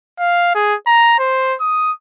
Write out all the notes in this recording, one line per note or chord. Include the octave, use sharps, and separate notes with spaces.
F5
G#4
A#5
C5
D#6